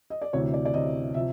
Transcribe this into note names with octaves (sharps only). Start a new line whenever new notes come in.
D#5
D5
D2 C3 E3 C#5
D5
D5
D2 C3 E3 D#5
C3 F3 E5